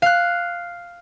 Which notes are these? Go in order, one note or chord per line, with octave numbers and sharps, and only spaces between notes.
F5 F#6